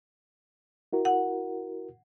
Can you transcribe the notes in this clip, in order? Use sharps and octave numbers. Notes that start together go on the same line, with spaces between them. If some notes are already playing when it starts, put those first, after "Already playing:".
E4 F#4 A#4
F#5